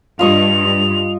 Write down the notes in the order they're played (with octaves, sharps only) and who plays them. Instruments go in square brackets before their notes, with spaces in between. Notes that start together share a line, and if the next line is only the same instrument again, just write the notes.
[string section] G2 [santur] F4 D#5 C#6 [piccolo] F7